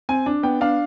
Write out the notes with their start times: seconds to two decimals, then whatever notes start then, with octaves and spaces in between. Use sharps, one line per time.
0.09 C4 G#5
0.26 D4
0.43 B3 G5
0.61 D4 F5